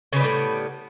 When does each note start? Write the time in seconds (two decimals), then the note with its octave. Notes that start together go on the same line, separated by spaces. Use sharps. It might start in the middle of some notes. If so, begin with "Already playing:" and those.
0.13 C#3
0.16 B3
0.20 G3
0.24 A2